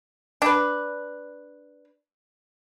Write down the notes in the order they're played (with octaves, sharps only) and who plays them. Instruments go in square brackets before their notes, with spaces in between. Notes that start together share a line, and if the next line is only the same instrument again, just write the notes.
[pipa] D4 B4